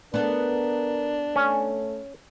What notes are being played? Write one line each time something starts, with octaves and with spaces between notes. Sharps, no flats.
B3 D4 A4 A#4
A3 C#4